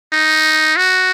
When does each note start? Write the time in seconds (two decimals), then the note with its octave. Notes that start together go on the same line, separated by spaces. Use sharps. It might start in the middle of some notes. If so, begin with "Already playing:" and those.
0.13 D#4
0.76 F#4